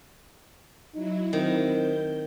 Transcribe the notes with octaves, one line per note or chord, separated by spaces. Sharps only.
F#3 D#4 E4
D#3 C4
G6